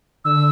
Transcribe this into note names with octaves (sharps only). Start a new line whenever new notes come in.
D3 E6